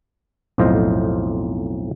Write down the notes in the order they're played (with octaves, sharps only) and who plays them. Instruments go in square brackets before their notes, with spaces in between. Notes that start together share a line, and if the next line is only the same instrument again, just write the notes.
[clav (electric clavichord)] B1 F2 A2 F4 C5 D#5